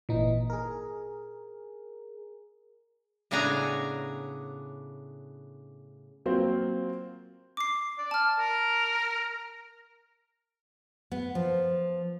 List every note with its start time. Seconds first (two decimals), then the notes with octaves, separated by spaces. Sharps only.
0.09 G#1 A#2 E3 D#4
0.50 G#4 A#4
3.31 A2 C#3 B3 D4 G#5 A#5
6.26 F#3 A#3 C4 F4 F#4 C5
7.57 D6 C7
7.98 D5
8.11 A5 F6
8.39 A#4
11.12 B3
11.35 F3